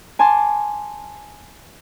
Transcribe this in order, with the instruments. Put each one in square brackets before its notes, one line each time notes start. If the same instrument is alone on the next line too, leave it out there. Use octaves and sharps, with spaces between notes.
[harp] G#5 A5 C6 D6